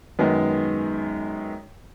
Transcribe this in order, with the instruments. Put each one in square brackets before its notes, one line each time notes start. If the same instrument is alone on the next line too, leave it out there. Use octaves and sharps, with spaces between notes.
[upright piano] F#2 D#3 G#3 B3